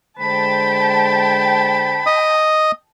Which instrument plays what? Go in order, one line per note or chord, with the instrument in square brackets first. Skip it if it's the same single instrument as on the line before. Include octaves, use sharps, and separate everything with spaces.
[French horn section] D3 G#3 C5 [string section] G5 A5 [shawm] B5
[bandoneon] D#5 D#6